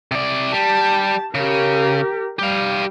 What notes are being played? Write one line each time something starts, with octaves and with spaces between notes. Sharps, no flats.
C3 D5
G3 G4 A5
C#3 G4 A#4
G3 G4 F5